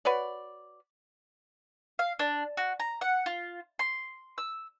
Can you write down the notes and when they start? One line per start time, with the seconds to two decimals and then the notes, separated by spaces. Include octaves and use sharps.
0.05 F#4 B4 C#5 D5
1.99 F5
2.19 D4
2.57 F#4
2.80 A#5
3.01 F#5
3.26 F4
3.79 C6
4.38 E6